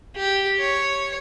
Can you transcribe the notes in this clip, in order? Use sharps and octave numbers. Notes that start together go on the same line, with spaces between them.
G4
C#5